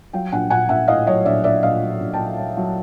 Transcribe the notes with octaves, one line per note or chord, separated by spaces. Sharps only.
F#3 F5 G5
A#1 F#5 G#5
A#1 F#5 G#5
A#1 E5 F#5
A2 D#5 F5
F#3 C#5 D#5
A#1 D5 E5
A#1 D5 E5
A#1 D#5 F5
F#3
A#1
G5 A5
A#1
F#3
F#3